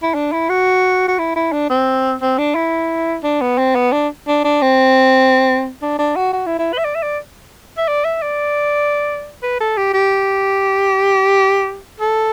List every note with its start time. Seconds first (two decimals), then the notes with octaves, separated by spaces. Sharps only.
0.03 E4
0.14 D4
0.32 E4
0.49 F#4
1.08 F#4
1.19 E4
1.36 E4
1.52 D4
1.70 C4
2.21 C4
2.38 D4
2.55 E4
3.23 D4
3.41 B3
3.58 C4
3.75 B3
3.92 D4
4.28 D4
4.44 D4
4.62 C4
5.82 D4
5.98 D4
6.16 F#4
6.33 F#4
6.46 E4
6.59 E4
6.73 B4
6.78 E5
6.85 D5
6.95 E5
7.03 D5
7.78 E5
7.88 D5
8.05 E5
8.22 D5
9.43 B4
9.60 A4
9.77 G4
9.94 G4
12.00 A4